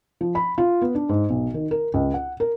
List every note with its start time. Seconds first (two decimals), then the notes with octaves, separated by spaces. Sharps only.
0.21 F3
0.35 B5
0.58 F4
0.82 B3
0.95 D4
1.09 G#2
1.30 B1
1.54 D#3
1.71 A#4
1.94 C#2
2.14 F#5
2.40 A#4